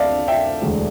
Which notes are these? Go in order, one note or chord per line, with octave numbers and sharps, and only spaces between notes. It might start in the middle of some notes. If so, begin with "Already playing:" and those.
Already playing: D2 C3 A4 D5 E5 F5
E5 G5
E1 D2 D3 A3